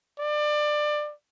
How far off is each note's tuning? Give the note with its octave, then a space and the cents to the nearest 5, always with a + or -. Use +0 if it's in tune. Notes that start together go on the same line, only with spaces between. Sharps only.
D5 +25